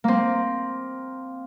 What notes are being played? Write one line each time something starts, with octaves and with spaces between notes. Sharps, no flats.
A#3 C4